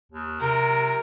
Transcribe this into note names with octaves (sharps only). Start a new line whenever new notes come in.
D#2
C3 A#4